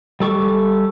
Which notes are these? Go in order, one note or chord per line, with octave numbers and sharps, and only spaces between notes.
G3 A4 C#6 D6